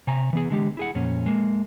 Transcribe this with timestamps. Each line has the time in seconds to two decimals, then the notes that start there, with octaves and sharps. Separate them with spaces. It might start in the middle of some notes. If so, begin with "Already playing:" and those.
0.07 C3 G#5 A#5
0.33 E3 B3 G#4
0.50 D3 G#3 G4
0.77 E4 G#4 F#5
0.95 F2 A#2 C#4
1.26 G#3 A#3